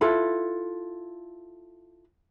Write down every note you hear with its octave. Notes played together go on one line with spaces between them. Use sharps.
E4 F4 A4 B4